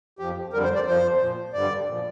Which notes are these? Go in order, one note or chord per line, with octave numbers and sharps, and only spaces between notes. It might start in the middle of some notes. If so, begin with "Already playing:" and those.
F2 F3 G4
F2 D3 G3 A#4
C5
D5
F2 F3 C5
A#2 F3
G2 D3 G3 D5
A#2 F3